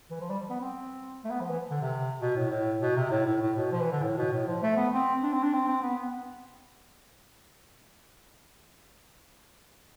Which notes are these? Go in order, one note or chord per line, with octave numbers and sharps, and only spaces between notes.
E3
F3
G3
B3
C4
A3
B3
F3
E3
D3
C3
B2
A2
A2
B2
C3
A2
A2
A2
B2
F3
E3
D3
A2
B2
A2
F3
A3
B3
C4
D4
C4
D4
C4
C4
B3
B3